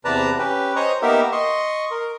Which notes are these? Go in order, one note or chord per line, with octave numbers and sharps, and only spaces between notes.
E2 C3 B4 D5 A5 A#5
C#4 G4 B4
C5 C#5 D#5 A#5 C#6 D#6
A#3 B3 D#4 G4 A#4 E5
D#5 C6 C#6
A#4